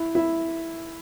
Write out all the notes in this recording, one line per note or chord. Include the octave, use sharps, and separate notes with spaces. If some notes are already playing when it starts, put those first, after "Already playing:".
Already playing: E4
E4